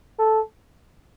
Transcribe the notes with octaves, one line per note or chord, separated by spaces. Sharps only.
A4